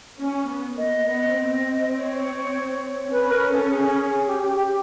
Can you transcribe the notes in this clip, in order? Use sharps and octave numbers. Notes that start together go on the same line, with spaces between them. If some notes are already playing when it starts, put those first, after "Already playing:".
C#4
B3
A#3 D#5
B3 D#5
C4
C#5
C#4 B4
A#4
A4
G#4
G4
G4
G4